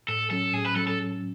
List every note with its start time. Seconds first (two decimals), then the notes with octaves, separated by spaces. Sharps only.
0.08 A2 A4
0.30 F#3 C#4 A4
0.53 A2 G#4
0.65 B4
0.76 F#3 C#4 A4
0.87 A4